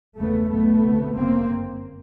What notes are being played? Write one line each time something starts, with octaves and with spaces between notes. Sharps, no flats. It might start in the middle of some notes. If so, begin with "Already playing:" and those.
F#1 E2 C#3 A3 B3
B1 B2 A3 B3
D2 C3
G1 F#2 C#3 A#3 C4